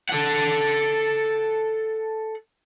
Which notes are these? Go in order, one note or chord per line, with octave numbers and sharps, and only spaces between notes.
A4 F#5